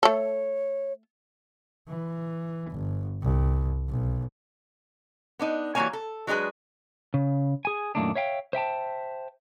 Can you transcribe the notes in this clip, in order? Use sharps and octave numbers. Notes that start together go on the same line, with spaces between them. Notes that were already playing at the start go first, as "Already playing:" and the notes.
A3 A4 C#5
E3
G1
C2
B1
B3 D4 D#4
E3 F#3 G3 A#3 C#5 G#5
A4
F#3 G#3 D4 G#4 B4
C#3
G#4 G#5
F#2 A#2 D#3 A3 A#3 D4
C#5 E5 F5 G5
C5 E5 G5 A5